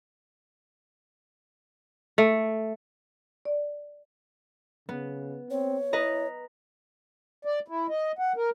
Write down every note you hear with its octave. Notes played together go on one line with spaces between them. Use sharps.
A3
D5
C#3 B3
C4 C#5
E4 B4 D#5 A#5
D5
E4
D#5
F#5
A#4